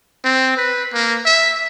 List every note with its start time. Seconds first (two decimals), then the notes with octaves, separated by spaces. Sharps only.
0.24 C4
0.57 B4
0.94 A#3
1.25 E5